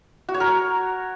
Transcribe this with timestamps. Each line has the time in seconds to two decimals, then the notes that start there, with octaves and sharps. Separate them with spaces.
0.29 F#4
0.34 C#5
0.40 A#4